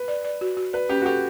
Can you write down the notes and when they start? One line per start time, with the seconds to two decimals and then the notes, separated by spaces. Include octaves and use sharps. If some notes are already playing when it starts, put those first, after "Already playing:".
Already playing: B4
0.08 D5
0.24 D5
0.41 F#4
0.57 F#4
0.73 B4 D5
0.89 C#4 G4
1.02 F#4
1.06 G4 A4